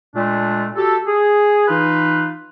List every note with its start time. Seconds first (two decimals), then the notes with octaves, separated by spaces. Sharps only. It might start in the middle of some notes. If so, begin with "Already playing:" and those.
0.15 A#2 G#3 A3 D4
0.76 F#4 G4 A4
1.07 G#4
1.68 E3 D#4 F4 B4